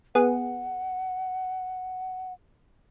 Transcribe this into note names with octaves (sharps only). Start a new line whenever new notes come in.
B3 G#4 F#5